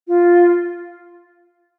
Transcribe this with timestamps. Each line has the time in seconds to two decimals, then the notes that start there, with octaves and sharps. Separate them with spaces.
0.08 F4